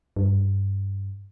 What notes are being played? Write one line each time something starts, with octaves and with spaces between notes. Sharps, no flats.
G2